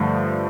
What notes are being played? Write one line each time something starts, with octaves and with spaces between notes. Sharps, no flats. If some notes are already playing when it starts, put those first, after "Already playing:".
Already playing: G2 D3 F3 A3